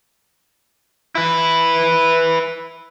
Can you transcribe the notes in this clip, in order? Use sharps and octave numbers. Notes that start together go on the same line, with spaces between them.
E4 B4